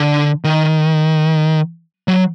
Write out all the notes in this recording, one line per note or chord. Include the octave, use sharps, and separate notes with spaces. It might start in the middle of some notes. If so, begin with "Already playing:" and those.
Already playing: D3
D#3
F#3